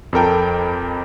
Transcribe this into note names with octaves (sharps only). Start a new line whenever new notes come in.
F2 A4 A#4 G5